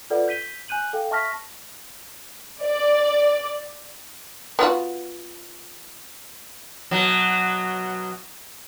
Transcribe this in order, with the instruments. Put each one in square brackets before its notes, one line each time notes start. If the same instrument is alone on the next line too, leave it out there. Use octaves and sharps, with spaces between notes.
[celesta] F4 A4 B4 D5 E5 F#5
G6 B6 D#7 G7
G#5 F#6 G6 D#7 F#7
A4 F5 G5
E5 A5 C#6 F6 A#6 B6
[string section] D5
[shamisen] B3 F4 F#4
[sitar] B2 F#3